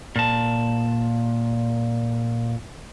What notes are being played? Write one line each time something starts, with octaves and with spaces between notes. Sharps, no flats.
A#2 A5